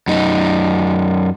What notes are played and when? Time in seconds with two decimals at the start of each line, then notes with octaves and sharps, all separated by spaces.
0.08 F#2 D#4